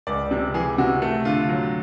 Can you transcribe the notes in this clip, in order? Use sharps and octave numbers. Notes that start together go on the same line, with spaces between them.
C#2 D5
C3
E3 G#4
C3 F#4
A3
D3 F4
F#3